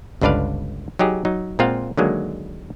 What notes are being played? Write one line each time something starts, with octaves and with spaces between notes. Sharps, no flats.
G1 C#2 D4 B4 D5 F5
F#3 D#4 G4 G#4
F#3 D#4
A#2 G#3 C4 F4 F5 F#5
D3 D#3 F#3 G#3 A#3